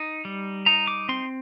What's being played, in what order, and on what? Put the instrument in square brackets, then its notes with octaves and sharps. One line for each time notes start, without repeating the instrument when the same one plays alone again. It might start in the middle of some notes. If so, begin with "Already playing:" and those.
Already playing: [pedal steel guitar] D#4
G3
D#4 A#5
D6
C4 C6